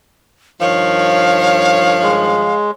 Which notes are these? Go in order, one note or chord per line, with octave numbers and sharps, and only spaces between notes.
G2 D#3 F3 C#5 F5
G#3